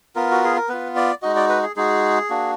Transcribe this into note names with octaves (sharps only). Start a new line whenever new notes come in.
B3 F4 A#4
F#4
G#4
A#4
B3 F4 B4
D5
G#3 D#4 F#4 D#5
D5
B4
G#4
G#3 D#4 F#4 G#4
A#3 D4 F#4